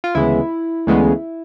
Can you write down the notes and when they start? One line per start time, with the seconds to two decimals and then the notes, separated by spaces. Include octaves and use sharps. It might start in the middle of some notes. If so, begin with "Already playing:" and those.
0.04 F4
0.15 D2 C#3 E3 G#3 B3 E4
0.87 D2 C#3 E3 G#3 B3